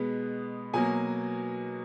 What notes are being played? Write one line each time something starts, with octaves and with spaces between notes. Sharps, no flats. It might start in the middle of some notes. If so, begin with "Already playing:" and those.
Already playing: B2 G#3 B3
B2 F#3 A#3 G#5